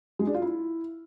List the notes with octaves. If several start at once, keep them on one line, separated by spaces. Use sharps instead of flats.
G#3
D4
F4
E4